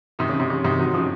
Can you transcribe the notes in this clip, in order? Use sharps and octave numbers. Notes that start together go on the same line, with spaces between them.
C3 D#3
C#3
C3
C#3
C3 D#3
D#3 F#3
C#3 F3